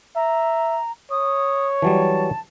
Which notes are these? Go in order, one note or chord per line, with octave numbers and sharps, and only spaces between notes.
E5 A#5
C#5 D#6
E3 F#3 G3 A5